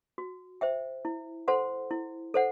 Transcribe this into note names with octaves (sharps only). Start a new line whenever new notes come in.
F#4
C5 E5 G5
E4
A4 C5 F#5 C6
E4
A4 C5 F#5